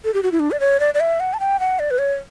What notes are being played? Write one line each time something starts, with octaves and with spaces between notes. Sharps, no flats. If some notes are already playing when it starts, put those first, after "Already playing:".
A4
G4
F#4
E4
D4
D5
C#5
D5
D5
E5
F#5
A5
G5
F#5
D5
B4
C#5